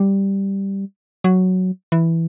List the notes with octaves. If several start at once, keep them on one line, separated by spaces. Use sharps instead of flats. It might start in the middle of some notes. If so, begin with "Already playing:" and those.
Already playing: G3
F#3
E3